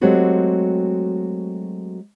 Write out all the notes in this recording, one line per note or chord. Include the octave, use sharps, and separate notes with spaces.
F#3 G#3 A3 C4 F#4 G4